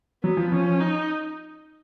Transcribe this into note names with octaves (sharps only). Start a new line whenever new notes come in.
F#3 B3
F3
F3 C#4
D#4